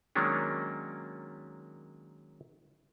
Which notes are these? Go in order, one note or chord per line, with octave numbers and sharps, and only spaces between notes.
D#3 F#3 G#3 A#3 C#4 D4